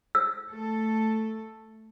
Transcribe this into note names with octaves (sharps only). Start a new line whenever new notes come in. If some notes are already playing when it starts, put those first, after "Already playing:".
E6
A3 A4